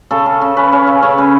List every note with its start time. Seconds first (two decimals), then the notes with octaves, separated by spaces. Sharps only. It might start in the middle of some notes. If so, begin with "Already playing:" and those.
0.11 C#3 A4
0.26 C#4
0.41 C#3
0.57 C#4 B4
0.72 C#4
0.87 C#3
1.02 C#3 C#5
1.18 C#4 B4